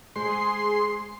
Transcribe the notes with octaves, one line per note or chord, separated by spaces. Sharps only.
G#3 G#4 C5 C6